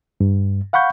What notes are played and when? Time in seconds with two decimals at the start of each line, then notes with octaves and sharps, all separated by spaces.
0.20 G2
0.73 F5 F#5 B5 C#6 G6